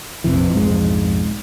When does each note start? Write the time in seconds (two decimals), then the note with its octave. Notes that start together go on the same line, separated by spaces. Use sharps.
0.24 A#1 F2 C3 E3
0.53 B1 F2 G#2 G#3